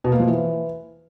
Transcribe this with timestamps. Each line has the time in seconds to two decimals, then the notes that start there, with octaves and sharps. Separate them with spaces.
0.04 B2
0.12 A#3
0.20 F3
0.27 E3